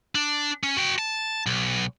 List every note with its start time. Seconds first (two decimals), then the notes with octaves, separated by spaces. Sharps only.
0.15 D4
0.64 C#4
0.77 F#4 G5
0.98 A5
1.46 B1